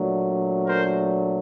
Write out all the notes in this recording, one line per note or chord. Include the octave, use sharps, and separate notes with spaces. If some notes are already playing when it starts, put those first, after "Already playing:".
Already playing: A#2 F#3 A3 D4
A#4 C5